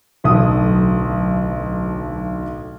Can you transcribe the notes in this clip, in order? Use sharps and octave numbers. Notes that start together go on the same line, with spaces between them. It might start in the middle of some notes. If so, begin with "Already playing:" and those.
D1 B1 A4 D#6